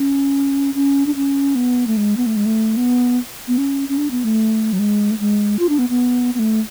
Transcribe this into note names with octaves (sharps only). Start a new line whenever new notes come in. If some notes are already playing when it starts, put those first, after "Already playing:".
Already playing: C#4
C#4
D4
C#4
B3
A3
G#3
B3
A3
G#3
A3
B3
B3
C#4
C#4
D4
B3
A3
F#3
G#3
A3
G#3
F4
D4
B3
B3
B3
A3